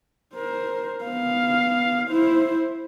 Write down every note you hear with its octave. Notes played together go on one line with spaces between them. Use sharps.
A#4 C5
B3 F5
E4 C5